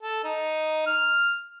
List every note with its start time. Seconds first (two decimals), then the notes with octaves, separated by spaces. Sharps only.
0.03 A4
0.24 D#4
0.87 F6